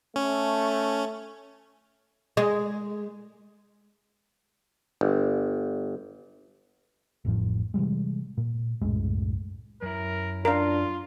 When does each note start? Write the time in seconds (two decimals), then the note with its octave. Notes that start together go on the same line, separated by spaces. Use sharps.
0.16 A3 C#4
2.37 G#3
5.01 G1
7.25 A1 F2 A2 F3
7.74 C3 E3 G3 G#3
8.38 A#2
8.82 C2 F#2 A2 G#3
9.82 F#2 E4 A#4
10.45 D4 F4 A#4 F5